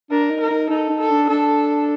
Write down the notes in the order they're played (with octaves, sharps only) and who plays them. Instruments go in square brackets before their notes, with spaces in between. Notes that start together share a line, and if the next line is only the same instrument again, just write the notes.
[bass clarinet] D4 [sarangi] A#4
[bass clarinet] D#4
[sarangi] A#4
[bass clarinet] D#4
[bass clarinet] D#4 [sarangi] A4
[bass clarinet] D#4
[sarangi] A4
[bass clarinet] D4
[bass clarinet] D4 [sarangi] A4